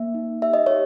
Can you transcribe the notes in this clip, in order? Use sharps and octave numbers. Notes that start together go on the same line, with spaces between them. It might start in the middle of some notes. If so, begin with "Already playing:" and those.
Already playing: A#3 E5
D#4
G4 E5
D#5
G4 C#5